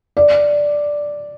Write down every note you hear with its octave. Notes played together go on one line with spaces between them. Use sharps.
D5